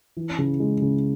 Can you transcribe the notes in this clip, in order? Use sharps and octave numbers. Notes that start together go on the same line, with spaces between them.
E3
C#3
G#3
C#3